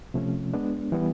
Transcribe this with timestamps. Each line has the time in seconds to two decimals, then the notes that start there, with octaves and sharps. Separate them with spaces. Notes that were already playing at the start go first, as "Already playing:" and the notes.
0.14 C3 F3 A3 C#4
0.53 G#3 B3 D4
0.92 E3 G3 B3